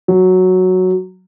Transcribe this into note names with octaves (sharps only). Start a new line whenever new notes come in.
F#3